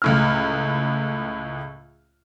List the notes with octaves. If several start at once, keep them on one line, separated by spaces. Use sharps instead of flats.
C#2 A2 F6